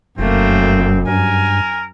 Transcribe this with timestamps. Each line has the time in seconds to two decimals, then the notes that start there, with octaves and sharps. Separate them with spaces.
0.19 F1 F#2 A3 A#3 C4
1.07 G2 A#4 G#5